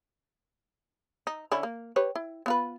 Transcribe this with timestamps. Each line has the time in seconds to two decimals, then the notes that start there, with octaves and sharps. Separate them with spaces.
1.27 D#4
1.52 D3 C#4 E4
1.63 A#3
1.96 G4 B4 C#5
2.15 E4
2.46 B3 F4 B4